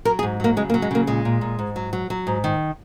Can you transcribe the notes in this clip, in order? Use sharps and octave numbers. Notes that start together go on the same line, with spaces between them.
F#3 A#4
G#4
G#2
F#3 A#3
C#3 G#3
A#3
F#3
G#3
C#3 A#3
A#2 G#3
A#2
A#2
G#2
F#3
F#3
F#3
G#2
D#3